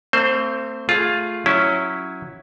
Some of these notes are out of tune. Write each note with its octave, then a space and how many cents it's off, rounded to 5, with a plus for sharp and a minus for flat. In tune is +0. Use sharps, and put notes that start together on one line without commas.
A3 +45 C4 +0 C5 +0
A3 +0 F4 +0 G#4 +0
F#3 +0 C#4 +0 E4 +0